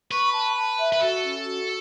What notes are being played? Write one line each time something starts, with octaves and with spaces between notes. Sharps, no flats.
B4 C#6
A5
A5
E5
B4
F#4 A4
C#4
F#4